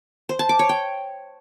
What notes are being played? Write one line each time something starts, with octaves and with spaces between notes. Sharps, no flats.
C5
A5
D6
C#5
G5